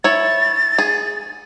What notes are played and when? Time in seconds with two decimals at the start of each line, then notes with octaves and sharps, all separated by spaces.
0.04 E4 C#5 A6
0.78 G#4